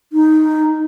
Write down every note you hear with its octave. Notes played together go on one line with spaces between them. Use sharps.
D#4